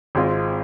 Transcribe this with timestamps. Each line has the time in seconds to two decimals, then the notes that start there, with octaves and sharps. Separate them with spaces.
0.15 G#1 G#2 G#3 C4 F4